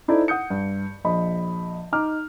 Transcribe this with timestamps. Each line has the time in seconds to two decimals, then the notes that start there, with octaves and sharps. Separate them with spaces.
0.08 D#4 E4 A4 C5 D5
0.28 F#5 D#6 G6 C#7
0.50 G2
1.04 A#1 D#5 B5
1.92 D#4 A#5 D6 F6